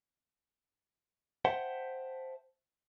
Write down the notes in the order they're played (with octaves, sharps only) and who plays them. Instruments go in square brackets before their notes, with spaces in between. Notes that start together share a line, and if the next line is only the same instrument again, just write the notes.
[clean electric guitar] C5 E5 F#5 G5 A5 C6